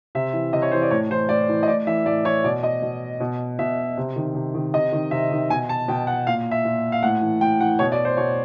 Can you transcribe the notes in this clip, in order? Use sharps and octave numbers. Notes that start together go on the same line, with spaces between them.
C3 E5
E3
C3 D#5
C#5
E3 C5
D5
A2 C#5
E3 C5
A2 D5
E3
D#5
A2 D5
E3 E5
A2 D5
E3 C#5
B2 D5
D#5
B2
B2
B2 E5
C3
D#3
C3
D#3
C3 D#5
D#3
C3 E5
D#3
B2 G#5
A5
B2 G5
F#5
A#2 F5
E5
A#2
F5
A2 F#5
E3
A2 G5
E3 F#5
B2 C#5
D5
C5
B2 C#5